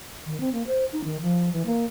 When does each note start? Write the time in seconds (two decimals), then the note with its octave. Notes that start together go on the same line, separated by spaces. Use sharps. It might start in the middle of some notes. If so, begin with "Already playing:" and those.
0.26 D#3
0.40 C4
0.53 A#3
0.67 C5
0.92 D#4
1.04 D#3
1.22 F3
1.53 E3
1.66 A#3